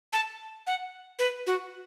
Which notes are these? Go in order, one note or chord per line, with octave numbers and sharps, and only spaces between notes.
A5
F#5
B4
F#4